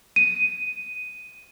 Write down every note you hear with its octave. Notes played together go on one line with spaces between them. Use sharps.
D#7